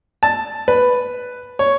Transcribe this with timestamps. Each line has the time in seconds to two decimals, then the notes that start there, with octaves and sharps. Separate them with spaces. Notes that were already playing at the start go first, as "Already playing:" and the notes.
0.23 A5
0.68 B4
1.59 C#5